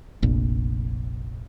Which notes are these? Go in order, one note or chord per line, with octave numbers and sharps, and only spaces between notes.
F1 A#1